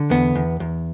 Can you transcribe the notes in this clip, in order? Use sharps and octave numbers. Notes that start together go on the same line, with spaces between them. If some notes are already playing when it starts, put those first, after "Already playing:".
Already playing: D3
E2 B3
E2
E2